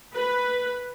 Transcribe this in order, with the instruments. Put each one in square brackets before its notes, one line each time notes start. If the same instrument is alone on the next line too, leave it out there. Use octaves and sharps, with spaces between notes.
[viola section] B4